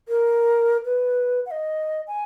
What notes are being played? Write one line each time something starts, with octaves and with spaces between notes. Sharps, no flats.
A#4
B4
F#5
D#5
G#5